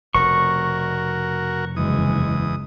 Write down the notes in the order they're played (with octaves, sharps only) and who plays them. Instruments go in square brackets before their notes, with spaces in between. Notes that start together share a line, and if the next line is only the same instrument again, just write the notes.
[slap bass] F1 B2 [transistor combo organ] F#4 A#4 [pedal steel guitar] C#6
[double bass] F#1 G#3 [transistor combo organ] E2 D#6